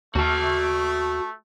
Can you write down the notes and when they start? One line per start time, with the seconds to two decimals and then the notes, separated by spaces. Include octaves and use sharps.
0.15 D#2 A3 F#4 A5